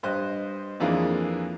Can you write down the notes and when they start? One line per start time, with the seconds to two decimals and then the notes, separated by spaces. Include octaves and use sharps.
0.03 G2 C5 D#5 F#6
0.80 F2 E3 A#3 D4 F4 G#4